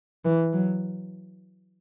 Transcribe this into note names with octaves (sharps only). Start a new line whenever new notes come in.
E3
F#3